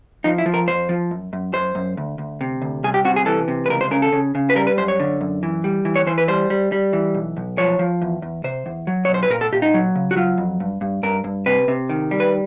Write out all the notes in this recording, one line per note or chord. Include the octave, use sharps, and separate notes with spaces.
F3 D#4
E4
F3
A#4
F2 C5
F3
F#2
F#2
F#2 C5
F#2
D2
D2
C3
D2
C2 G#4
G4
C3 F#4
G#4
E3 A4
C3
B4
C#2 A#4
C5
C#3 A#4
A4
C#3
C#3
B4
G3 A#4
B4
F#2 C5
C#5
D3
F#2
E3
G3
E3
C#5
E3 C5
B4
G3 C5
G3
G3
E3
B1
B1
F3 C#5
F3
E2
E2
C3 C5
E2
F#3
C#5
B1
C5
B4
A#2 A#4
A4
A#2 G4
D#4
F#3
C#3
F#4
F#3 F4
F2
G2
G2
G2 A#4
G2
C3 B4
C3
D#3
G3
B4